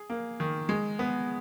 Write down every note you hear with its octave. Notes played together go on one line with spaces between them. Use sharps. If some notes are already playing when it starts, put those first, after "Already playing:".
Already playing: G#4
A#3
D#3
G#3
B3